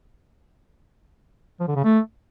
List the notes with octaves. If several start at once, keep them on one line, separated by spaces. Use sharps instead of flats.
F3
D3
C#3
A3